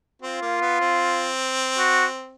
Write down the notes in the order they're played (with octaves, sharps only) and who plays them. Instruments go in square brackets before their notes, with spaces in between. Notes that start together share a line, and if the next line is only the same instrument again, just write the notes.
[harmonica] C4 [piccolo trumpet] F4
[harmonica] A#3
B3
C4
[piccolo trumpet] F#4